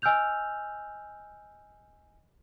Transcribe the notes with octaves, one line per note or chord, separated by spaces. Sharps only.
D#5 G#5 E6 F6 G6 F7